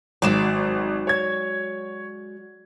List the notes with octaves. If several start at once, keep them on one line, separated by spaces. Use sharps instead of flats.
G#1 F#3 G#3 D5 E7
C#5 G#6